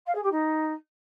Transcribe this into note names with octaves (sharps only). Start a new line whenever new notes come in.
F5
G#4
G4
D#4